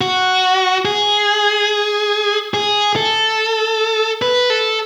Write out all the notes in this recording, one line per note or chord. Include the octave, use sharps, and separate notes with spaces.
F#4
G#4
G#4
A4
B4
A4